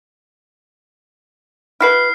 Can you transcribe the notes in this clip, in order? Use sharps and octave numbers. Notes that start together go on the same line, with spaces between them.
E4 F#4 B4 F6 C7